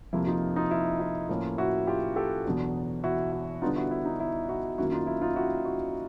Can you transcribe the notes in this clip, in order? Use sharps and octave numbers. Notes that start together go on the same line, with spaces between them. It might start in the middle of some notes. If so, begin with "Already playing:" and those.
F2 C3 F3 A#3 E4
D#4 F4
D#4 F4
E4
E4
A2 F3 A#3 C#4 E4
E4 F#4
F4 G4
G4 A4
E2 B2 F#3 B3 D4
E4 F#4
E4
D3 G3 B3 D4 D#4 F4
E4 F#4
E4
D#4
E4
E4 F#4
F#2 D#3 F#3 A#3 E4 F#4
D#4 F4
E4
D#4 F4
E4 F#4
E4 F#4